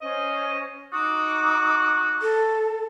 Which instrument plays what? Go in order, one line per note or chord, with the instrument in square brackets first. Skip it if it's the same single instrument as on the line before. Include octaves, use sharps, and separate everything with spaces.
[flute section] C#4 C5 [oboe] D#5
[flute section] D#4 D6 D#6 [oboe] F#4
[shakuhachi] A4